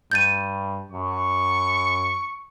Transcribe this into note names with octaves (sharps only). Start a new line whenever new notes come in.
G2 G6 A6 D#7
F#2 C#6